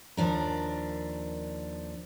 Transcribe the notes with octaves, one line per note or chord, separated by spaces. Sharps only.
D#2 F3 D4 A#4